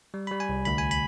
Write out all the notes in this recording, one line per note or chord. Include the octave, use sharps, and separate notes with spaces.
G3
G3 B5
G#5
C2
D2 B5
G#5
B5